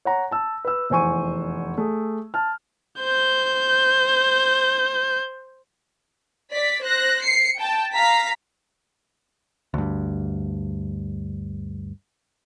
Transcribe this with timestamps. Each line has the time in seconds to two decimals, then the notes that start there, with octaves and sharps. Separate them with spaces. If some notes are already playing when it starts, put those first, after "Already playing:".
0.05 C#5 F#5 A#5
0.31 A5 E6
0.65 B4 E6
0.90 F1 E2 C5 G#5 C#6 D#7
1.78 A3 G#4
2.34 A5 F6
3.00 C5 G6
6.53 D5 B6
6.83 C5 F#6 A#6
7.22 C7 C#7
7.58 G5 A5
7.93 F5 A#5 B6
9.74 D2 G2